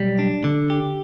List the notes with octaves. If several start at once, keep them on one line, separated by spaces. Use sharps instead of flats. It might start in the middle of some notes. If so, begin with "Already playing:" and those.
Already playing: B1 G3
D4
D3
G4